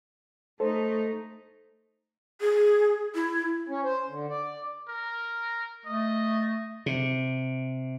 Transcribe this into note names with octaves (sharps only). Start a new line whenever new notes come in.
A3 D#4 A4 C5
G#4
E4
C#4
C5
D3
D5
A#4
A3 D#5
C3